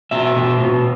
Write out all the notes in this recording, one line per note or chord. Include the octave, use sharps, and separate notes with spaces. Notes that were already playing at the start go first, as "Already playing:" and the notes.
B2 E5
B2
B2